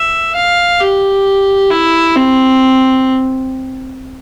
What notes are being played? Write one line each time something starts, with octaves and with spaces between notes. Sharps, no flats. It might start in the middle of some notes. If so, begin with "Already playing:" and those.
Already playing: E5
F5
G4
E4
C4